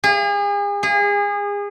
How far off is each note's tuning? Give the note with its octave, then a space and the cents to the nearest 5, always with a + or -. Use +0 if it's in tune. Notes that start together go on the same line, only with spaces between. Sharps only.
G#4 -40
G#4 -30